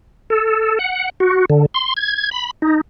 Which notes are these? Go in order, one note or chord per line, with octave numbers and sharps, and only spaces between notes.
A4
F#5
F#4
D3
C6
G#6
B5
D#4